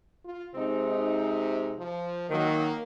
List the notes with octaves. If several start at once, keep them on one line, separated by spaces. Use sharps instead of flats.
F4
C3 G#3 C4 D#4
F3
D#3 F#3 A#3